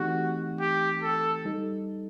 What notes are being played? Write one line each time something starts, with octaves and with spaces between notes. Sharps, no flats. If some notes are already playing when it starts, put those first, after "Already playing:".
Already playing: E3 A3 C4 D#4 F#4 G4
G4
A4
G3 D#4 A4